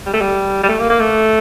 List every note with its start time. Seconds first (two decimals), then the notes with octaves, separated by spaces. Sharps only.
0.06 G3
0.13 A3
0.21 G3
0.63 G3
0.69 A3
0.79 A#3
0.90 A#3
1.00 A3